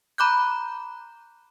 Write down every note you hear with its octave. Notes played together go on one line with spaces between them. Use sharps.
A#5 B5 D6 F#6 G6